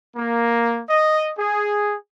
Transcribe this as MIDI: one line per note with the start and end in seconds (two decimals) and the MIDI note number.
0.15 0.81 58
0.87 1.29 75
1.37 1.94 68